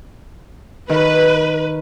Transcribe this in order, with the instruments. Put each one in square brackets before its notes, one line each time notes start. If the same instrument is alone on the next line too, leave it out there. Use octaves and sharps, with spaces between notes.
[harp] D#3 [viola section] B4